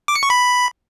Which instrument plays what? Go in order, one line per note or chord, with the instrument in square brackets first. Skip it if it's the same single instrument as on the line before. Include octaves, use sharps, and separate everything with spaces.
[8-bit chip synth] D6
C#7
C#6
B5